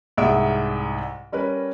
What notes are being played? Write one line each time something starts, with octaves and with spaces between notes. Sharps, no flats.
C2 G#2 E5 F#5 D#6 D7
G3 C#4 A#4 B4